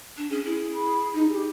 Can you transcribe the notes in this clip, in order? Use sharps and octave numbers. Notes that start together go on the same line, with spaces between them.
D4
C#4 G#4
E4 G#4
B5
D#4
G4 G#4